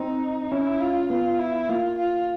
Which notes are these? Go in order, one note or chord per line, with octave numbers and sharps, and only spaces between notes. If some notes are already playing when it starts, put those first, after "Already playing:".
Already playing: C4 D#4
C#4 E4
F4
B3 F4
E4
A#3 F4
F4